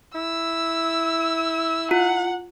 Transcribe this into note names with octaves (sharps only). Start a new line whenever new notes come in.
E4 E6
F4 F#5